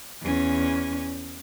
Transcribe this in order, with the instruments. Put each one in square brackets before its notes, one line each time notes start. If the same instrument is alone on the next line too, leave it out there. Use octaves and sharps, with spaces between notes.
[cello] E2 C#4